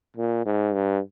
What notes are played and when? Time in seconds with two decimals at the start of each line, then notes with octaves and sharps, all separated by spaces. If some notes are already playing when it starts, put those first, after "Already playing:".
0.17 A#2
0.46 G#2
0.74 G2